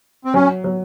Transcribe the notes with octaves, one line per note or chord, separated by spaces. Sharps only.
C4
F#3 C#4
F#3